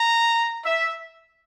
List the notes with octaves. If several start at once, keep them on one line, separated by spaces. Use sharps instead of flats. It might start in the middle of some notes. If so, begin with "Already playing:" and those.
Already playing: A#5
E5